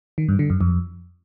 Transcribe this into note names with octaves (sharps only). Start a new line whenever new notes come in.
D#3
G2
D3
F#2
F2